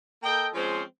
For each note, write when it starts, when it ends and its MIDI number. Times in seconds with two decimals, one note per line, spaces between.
0.23 0.49 58
0.23 0.49 69
0.23 0.49 75
0.23 0.49 79
0.54 0.83 53
0.54 0.83 56
0.54 0.83 60
0.54 0.83 61
0.54 0.83 68
0.54 0.83 72